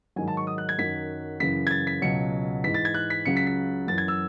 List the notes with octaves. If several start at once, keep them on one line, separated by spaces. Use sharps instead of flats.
G#2 D#3 F#3 G#5
A5
C#6
D#6
F#6
G#6
F#2 D#3 F#3 B6
F#2 C#3 E3 B6
G#6
A6
B6
C#2 B2 F#3 C#7
G#2 E3 B6
A6
G#6
F#6
B6
C#2 C#3 F#3 C#7
B6
B6
F#2 E3 A6
G#6
E6